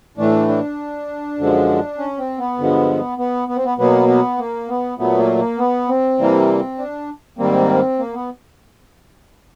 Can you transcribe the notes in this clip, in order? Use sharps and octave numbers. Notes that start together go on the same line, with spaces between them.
A2 E3 A3 D4
D4
F#2 D3 F3 G#3
C#4
C4
B3
G2 D3 F3 G#3
B3
B3
C4
B3
B2 F#3 A#3 B3
B3
A#3
B3
A#2 F#3 A3 B3
A#3
A#3
B3
C4
C3 E3 G3 A#3
D4
G#2 D#3 G3 A#3 C4
A#3
B3